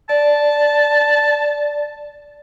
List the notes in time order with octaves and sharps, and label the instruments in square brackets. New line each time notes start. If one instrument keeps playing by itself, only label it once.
[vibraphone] D5 [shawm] A5